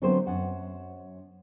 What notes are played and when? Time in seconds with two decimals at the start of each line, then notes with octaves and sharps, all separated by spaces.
0.02 D3 F#3 A3 B3 C4 C5
0.27 F#2 F#5